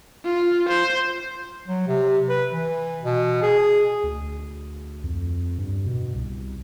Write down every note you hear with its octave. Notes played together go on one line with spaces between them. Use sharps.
F4
C5
F#3
C3
B4
E3
B2
G#4
D2
F2
G2
B2
C2